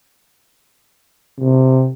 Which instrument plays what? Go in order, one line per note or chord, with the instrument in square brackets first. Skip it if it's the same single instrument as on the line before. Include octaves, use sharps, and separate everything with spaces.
[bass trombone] C3